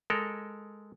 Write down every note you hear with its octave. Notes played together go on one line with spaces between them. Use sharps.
G#3 A4 A#4